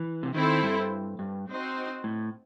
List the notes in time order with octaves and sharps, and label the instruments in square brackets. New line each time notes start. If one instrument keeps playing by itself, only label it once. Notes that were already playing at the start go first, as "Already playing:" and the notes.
Already playing: [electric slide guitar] E3
C3
[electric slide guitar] D#3 [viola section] C4 E4 A4 C5
[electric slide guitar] G2
G2
[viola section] C4 D#4 F#4 C5
[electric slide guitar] A2